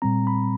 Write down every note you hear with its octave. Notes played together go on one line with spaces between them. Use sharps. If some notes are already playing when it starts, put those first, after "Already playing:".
A#2 G3 C4 A#5
B5